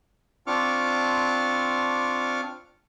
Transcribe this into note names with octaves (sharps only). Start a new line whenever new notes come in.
C4 D4 F4 C#6 D6 F6